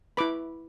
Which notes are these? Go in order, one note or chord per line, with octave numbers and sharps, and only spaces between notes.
E4 B4 B5 D6